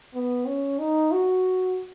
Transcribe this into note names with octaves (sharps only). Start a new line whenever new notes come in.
B3
C#4
D#4
F#4